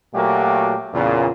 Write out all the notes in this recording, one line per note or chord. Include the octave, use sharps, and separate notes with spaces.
A#2 F#3 A3 A#3 F#4 G4
E2 A#2 C#3